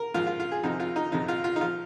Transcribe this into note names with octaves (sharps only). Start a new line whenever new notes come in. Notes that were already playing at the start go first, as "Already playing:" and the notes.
Already playing: A#4
G#2 F3 F4
F4
F4
G#4
F2 C3 F3 D#4
F4
D#4
F2 C3 F3 D#4
F4
F4
D#4
F3 F4